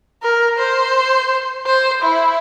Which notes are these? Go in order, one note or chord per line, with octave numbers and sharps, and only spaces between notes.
A#4
C5
C5
E4